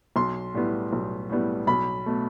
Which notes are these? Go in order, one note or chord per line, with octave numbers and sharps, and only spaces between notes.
B1 C6
A2 G3 B3
B1
A2 G3 B3
B1 B5
B2 A3